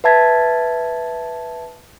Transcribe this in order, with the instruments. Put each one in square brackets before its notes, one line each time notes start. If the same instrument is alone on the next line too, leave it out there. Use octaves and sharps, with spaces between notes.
[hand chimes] B4 E5 A5 G#6 A6 B6